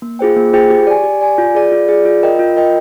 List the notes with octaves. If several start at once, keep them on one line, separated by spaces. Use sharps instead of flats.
A#3
F4 G#4 C5 G5
A#3
F4 G#4 C5 G5
G4
D5 G#5
G4
D5 G#5
F4
G#4 D5
F4
G#4 D5
F4
A#4 D#5 G5
F4
A#4 D#5 G5